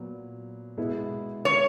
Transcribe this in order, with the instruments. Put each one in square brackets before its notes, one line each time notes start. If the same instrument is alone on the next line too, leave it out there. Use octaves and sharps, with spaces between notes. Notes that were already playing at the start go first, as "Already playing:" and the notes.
Already playing: [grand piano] A#2 F#3 B3
B2 G#3 B3 E4
[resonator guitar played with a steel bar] C#5